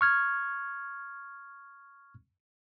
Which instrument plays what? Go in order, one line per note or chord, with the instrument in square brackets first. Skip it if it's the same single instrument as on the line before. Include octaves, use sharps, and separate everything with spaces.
[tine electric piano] C#6 F6 G#6